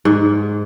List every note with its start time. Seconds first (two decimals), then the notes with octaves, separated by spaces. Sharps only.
0.05 G#2